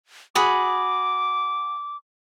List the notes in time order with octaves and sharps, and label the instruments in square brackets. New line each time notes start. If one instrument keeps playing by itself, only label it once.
[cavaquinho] F#4 G#4 B5 [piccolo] D6